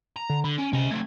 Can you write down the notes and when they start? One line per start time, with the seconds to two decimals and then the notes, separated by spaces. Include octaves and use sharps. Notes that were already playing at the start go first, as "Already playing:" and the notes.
0.16 A#5
0.29 D3
0.44 D3 B5
0.58 C#4 D7
0.73 C3 C#4 D#5
0.91 A3 C4 G#6